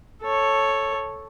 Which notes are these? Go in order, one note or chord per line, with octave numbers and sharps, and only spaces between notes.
A4 C#5